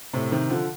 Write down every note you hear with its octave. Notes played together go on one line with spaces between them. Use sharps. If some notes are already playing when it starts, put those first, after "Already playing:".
A2 C3
C3 D#3
D3 F3